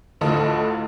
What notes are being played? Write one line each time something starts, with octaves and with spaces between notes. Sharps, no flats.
D2 A2 D3 F4 A4 D#5